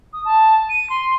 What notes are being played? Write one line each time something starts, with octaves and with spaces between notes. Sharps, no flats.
D#6
A5
D#7
C6